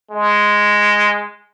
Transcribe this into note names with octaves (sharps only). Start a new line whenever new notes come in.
G#3